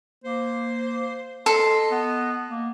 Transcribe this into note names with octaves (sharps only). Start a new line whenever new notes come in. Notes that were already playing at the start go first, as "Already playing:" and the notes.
A#3 C5
A4 D#5 C6
B3
A#3